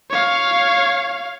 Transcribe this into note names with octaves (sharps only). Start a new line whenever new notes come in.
C#5 F5